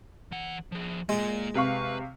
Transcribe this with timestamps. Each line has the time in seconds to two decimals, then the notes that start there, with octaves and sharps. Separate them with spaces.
0.32 E3 F#5
0.72 F3 G#4
1.09 G#3 A#3 F4
1.55 C3 B4 F5 C#6